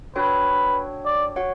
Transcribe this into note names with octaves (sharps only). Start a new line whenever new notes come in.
D4 F#4 A4 B4 C#5 G5
D5
F#4 C#5 F#5